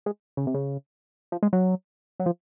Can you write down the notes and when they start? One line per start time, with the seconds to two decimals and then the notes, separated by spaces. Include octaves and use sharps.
0.06 G#3
0.37 C#3
0.47 C3
0.54 C#3
1.32 F3
1.43 G#3
1.53 F#3
2.20 F#3
2.26 F3